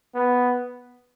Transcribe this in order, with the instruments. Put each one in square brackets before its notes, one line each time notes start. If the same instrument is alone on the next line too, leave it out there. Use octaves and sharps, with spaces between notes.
[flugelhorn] B3